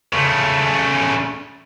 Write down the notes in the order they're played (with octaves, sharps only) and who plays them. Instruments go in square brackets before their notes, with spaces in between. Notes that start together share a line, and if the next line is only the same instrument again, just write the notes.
[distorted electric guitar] C#3 A3